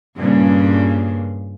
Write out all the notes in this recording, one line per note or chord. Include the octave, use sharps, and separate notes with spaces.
G2 A#2 C#3